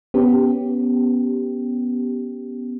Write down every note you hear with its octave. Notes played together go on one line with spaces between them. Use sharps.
B3 C#4 G4